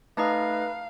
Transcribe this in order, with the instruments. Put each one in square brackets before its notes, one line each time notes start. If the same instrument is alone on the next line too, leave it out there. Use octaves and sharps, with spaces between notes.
[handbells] A3 D#4 D#5 [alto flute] B4 [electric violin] F5 [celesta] A5 A#5 D#6